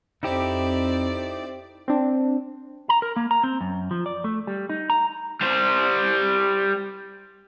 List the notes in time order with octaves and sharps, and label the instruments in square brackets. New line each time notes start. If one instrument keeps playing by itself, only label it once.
[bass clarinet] F2 [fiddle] C4 D5 [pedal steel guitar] D#4 E4 G4
[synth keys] C4 D4
[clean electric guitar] A#5
A#4
A#3
A#5
C4
F#2
F3
D5
A3
G3
D#4
A#5
[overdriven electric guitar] G3 C5